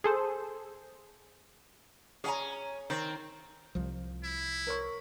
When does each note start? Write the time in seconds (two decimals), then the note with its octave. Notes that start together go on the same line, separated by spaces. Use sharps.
0.04 G#4 A4 C5
2.24 C#4 G#4 G#5 A#5
2.90 D#3 C4
3.75 C2 F3
4.24 E4
4.67 A#4 C#5 C#6